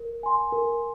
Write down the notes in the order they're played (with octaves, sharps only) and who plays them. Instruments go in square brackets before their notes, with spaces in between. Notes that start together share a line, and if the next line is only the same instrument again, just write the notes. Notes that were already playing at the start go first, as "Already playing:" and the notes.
Already playing: [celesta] A#4
G#5 C6
A#4